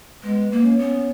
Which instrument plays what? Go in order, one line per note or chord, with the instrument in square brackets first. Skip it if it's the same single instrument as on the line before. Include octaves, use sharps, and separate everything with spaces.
[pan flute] G#3 [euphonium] B3
[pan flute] A#3
[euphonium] C#4
[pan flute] B3